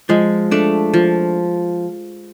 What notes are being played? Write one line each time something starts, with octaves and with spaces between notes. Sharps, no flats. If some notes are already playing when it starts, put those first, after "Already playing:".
F3 G#3
A3 D4
F3